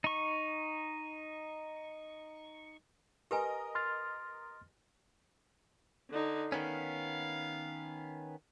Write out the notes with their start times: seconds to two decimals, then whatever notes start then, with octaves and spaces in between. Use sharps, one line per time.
0.04 D#4 C#6
3.31 G4 A#4 B4 D#5 G#5
3.75 C6 F6 A6
6.10 D3 D#4
6.52 D#3 B3 C#4 F5